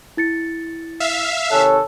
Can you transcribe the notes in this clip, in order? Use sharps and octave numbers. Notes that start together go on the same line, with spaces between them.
E4 A6 C#7
E5 F5
C3 D#3 A4 C#5 G#5 F#6